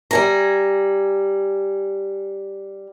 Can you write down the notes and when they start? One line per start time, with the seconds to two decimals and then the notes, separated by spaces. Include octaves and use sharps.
0.11 G3 G#5 A#5